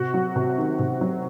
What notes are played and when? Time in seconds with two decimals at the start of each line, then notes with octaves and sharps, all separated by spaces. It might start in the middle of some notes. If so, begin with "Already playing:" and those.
Already playing: C3 F#4
0.14 F#3
0.36 C3
0.58 D#3
0.79 C3
1.01 F#3